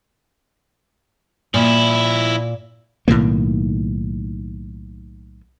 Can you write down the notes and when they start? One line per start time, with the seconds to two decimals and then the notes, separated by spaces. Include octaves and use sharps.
1.54 A#2 F3 E4
3.08 B1 A2 D#3 A#3